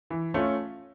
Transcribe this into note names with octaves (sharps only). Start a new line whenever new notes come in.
E3
A3 C#4 F4